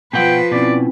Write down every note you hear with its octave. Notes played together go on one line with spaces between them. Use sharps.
B2 F3 B4 F#5 G5
B2 C4 C#4 E4 D5